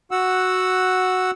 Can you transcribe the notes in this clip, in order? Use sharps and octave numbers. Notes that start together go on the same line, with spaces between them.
F#4 F#5 E6